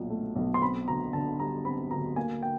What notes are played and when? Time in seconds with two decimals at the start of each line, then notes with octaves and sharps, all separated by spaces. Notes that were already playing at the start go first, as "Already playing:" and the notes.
Already playing: B1 A#2 F#3
0.10 A3
0.36 B1
0.54 C6
0.62 C4 B5
0.88 D2 A#5
1.13 D3 A5
1.40 G3 A#5
1.65 C4 B5
1.91 D2 A#5
2.16 A#3 G#5
2.43 G5